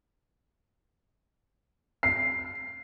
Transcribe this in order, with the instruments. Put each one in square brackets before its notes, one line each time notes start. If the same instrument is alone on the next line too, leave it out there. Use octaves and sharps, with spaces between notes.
[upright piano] C7